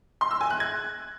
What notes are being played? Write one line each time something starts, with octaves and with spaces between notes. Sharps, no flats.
C6
E6
G#5
F#6
G#6